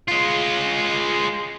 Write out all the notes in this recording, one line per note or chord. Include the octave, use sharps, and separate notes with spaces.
G#3 F4